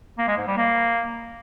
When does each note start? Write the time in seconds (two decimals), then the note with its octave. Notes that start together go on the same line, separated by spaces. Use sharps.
0.18 A#3
0.28 G#3
0.38 G#2
0.47 G3
0.57 A#3